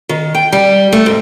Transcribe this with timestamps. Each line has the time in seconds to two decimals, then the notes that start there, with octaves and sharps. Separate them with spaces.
0.09 D#3
0.35 G5
0.52 G3
0.92 A3
1.06 G#2